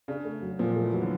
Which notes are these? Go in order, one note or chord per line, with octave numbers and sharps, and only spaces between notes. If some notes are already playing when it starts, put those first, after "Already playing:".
C#3 D4
A3
F#3
A#2 F3
A3
E3
F#3
D3